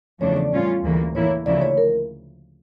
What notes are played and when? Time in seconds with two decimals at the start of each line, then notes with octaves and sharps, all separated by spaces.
0.21 E2 C#3 F3 A3 D4 C#5
0.36 D5
0.52 A2 G3 C#4 F4
0.84 D2 C#3 E3 A#3
1.15 A2 E3 A#3 E4 C#5
1.46 D2 C#3 F3 A#3 E4 D5
1.62 C#5
1.77 A#4